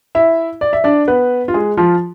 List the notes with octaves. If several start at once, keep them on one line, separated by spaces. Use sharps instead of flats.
E4 E5
D5
E5
D4 D5
B3 B4
F4
G#3 G#4
F3 F4